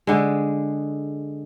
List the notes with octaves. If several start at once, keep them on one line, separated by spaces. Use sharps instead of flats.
D3 G#3